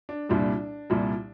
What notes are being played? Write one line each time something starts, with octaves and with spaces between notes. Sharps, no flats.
D4
C2 A#2 G3 D4
C2 A#2 G3